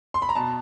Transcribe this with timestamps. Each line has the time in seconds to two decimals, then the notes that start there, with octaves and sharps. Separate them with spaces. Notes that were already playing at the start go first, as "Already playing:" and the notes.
0.14 C6
0.22 B5
0.29 A#5
0.35 B2 A5